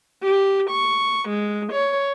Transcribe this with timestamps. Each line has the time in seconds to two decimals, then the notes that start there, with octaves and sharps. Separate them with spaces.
0.23 G4
0.70 C#6
1.29 G#3
1.73 C#5